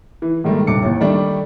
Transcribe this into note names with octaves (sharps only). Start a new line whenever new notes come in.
E3
G#2 D#3 G3 A3 A#3
D#1 G2 C3 D6 C#7
A1 D#2
D#3 G3 A3 D4